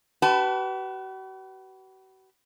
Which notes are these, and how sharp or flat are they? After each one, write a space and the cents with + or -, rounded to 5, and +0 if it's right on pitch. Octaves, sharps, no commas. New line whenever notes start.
F#4 +45 B4 +0 A5 +0